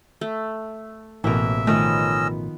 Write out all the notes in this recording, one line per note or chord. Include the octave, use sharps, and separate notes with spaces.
A3
A1 B2 E3 A#3 A#4 E5
D#3 F3 A3 B3 C#4 D#5 E6